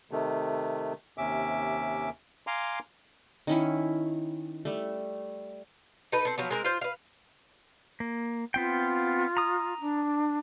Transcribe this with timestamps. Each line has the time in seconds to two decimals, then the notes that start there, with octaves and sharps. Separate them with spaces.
0.11 C3 D#3 A3
1.18 D#2 C3 C#4 E5 D6
2.47 F5 G#5 A#5 C6 D6
3.47 D#3 C#4 E4
4.65 G3 A3
6.12 D#4 A4 B4
6.25 C4 A4
6.38 F3 F#3 B3
6.50 G#3 C4 A#4
6.64 F4 C5
6.81 B4 F5
8.00 A#3
8.54 B3 C4 F4 G5
9.37 A#5 D#6
9.80 D4